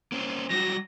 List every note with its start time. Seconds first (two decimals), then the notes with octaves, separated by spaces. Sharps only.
0.12 A#3 C#4 C5
0.50 F#3 G3 F#4 A#6